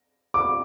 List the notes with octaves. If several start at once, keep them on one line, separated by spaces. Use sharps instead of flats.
D6